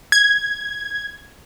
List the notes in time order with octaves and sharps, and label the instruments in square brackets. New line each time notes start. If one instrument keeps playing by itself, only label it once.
[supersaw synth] G#6